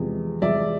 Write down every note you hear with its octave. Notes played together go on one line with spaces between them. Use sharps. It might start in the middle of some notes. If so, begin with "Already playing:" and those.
Already playing: E2 C3 F3 G#3
E2 C3 F3 G#3 D5 E5